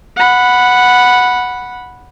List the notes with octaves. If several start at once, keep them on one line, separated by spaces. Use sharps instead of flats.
F#5 B5